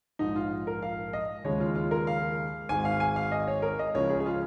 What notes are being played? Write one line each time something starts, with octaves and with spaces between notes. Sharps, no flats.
A#1 G#2 F3 D#4
F4
A#4
F5
D#5
D#2 C#3 F3 G#3 C#5
F4
F4
A#4
F5
G#1 G#2 G#3 G#5
F5
G#5
F5
D#5
C#5
A#4
D#5
C#2 C#3 F3 C#5
G#4
G#4
F4